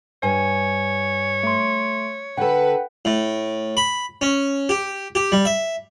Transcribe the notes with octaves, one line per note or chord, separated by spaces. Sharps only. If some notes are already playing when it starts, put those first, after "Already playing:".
G2 C#5 G#5
A3 C6
D3 A4 B4 F#5 G5
A2
B5
C#4
G4
G4
G3
E5